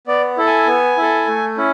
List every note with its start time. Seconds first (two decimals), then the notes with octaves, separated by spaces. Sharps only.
0.07 B3 D5
0.37 E4 A4
0.47 G#5
0.67 B3
0.97 E4 A4
1.27 A3
1.57 C#4 E4